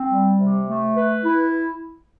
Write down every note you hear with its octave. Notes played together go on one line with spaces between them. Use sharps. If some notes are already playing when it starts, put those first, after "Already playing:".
Already playing: C4
G3
C3
A3
B4
E4